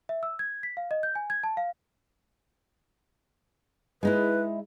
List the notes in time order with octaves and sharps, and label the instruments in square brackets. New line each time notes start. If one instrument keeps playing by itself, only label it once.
[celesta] E5
E6
G#6
B6
F5
D#5
G6
G#5
G#6
A5
F5
[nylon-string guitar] G#3 D#4 E4 [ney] B4